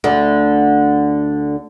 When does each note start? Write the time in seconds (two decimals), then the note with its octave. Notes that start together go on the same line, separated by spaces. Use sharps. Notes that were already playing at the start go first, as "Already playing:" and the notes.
0.04 D2 D3